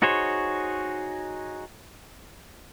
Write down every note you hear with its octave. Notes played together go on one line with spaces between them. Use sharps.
D#4 F#4 G#4 C5 C#5